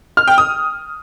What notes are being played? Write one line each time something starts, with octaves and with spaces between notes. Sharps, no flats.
F6
G5
D#6